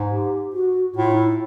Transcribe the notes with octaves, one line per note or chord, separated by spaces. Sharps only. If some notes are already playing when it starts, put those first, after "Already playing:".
Already playing: G#2
G4
F#4
A2 F4
D#4
E4